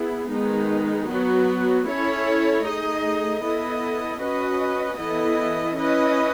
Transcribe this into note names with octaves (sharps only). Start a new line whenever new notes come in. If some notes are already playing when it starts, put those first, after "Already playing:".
Already playing: B3 E4 G#4
D#3 G#3 B3 D#4
F#3 B3 F#4
C#4 E4 A4 C#5
A3 D#4 G#4 D#5
B3 E4 A4 D#5
C#4 F#4 B4 D#5
E3 B3 E4 A4 D#5
C#4 E4 B4 D#5